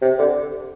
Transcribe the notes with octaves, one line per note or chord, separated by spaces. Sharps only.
C3
D3